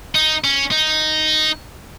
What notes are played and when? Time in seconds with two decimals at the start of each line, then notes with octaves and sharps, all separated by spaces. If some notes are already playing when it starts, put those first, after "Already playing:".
0.15 D#4
0.44 C#4
0.71 D#4